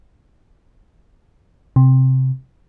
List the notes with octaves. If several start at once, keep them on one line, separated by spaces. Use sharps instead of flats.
C3